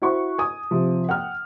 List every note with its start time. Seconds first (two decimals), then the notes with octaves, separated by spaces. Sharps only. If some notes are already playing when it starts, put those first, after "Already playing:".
0.02 E4 F#4 C5 F#5 C#6
0.38 G#5 D#6
0.71 C3 F3
1.09 F#5 G5 F6